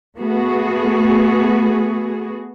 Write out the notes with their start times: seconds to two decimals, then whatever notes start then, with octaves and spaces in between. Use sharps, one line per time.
0.18 A3 B3 F#4 G#4